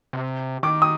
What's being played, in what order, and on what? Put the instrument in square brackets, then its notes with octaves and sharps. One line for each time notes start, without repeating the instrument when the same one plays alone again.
[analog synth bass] C3
[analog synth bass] D#3 [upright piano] D6
[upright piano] D#6